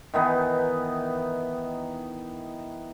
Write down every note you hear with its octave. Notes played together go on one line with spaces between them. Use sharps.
D#3 E3 B3 D#4